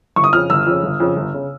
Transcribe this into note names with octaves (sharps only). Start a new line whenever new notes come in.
G1 C#6
D#6
F2 C#3 F6
G1 E6
F2 C#3
G1
F2 C#3
G1
C#3